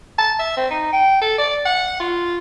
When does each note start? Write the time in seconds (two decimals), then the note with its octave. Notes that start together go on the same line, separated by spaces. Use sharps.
0.18 A5
0.39 E5
0.57 C4
0.70 D#4
0.93 G5
1.21 A4
1.38 D5
1.65 F#5
2.00 F4